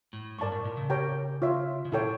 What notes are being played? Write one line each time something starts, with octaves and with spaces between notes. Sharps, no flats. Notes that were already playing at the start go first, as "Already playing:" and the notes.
A2
G2 A#4 D5 A5 C#6
A2
A#2
C#3
G4 A#4 C#5 G5 A#5
F4 C#5 E5
C#3
A#2 E4 A4 C#5 G5